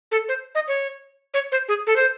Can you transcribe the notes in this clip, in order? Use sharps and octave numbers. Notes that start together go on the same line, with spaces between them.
A4
C5
D#5
C#5
C#5
C5
G#4
A4
C5